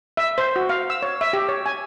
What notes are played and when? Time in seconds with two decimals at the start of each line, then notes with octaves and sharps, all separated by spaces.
0.17 E5
0.38 C5
0.56 F#4
0.69 F5
0.90 E6
1.02 C#5
1.21 E5
1.33 G4
1.49 C#5
1.66 G#5